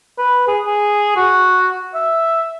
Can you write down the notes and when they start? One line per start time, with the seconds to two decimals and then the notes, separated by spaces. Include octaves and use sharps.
0.18 B4
0.48 G#4
0.66 G#4
1.17 F#4
1.95 E5